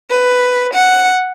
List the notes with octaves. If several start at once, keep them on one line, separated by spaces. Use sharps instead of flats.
B4
F#5